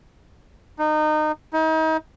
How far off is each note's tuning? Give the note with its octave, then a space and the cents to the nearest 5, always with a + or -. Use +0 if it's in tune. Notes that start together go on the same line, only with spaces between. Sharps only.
D#4 -25
D#4 +35